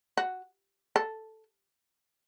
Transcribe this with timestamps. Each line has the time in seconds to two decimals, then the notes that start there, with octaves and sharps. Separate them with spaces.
0.17 F#4
0.96 A4